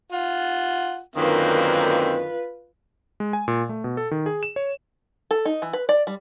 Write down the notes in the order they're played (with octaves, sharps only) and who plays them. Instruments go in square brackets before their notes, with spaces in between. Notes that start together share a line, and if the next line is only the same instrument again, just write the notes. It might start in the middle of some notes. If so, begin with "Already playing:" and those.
[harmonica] F4 F#5
[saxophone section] F#2 D3 D#3 [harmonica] A#3 C4 [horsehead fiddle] F4 B4
[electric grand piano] G#3
G#5
A#2
A3
B2
A4
D#3
G#4
E7
C#5
[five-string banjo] A4
D#4
E3
B4
D5
G3